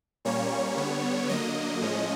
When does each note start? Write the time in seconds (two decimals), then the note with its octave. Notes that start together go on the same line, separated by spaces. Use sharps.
0.25 A#2 G3 A#3 C#4 C#5
0.77 D3 G3 B3
1.29 D3 F#3 A#3 D#5
1.81 A2 F3 G#3 C#4